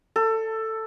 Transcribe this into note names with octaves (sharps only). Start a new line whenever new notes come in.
A4